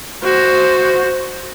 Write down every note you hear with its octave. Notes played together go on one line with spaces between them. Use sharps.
F#4 C5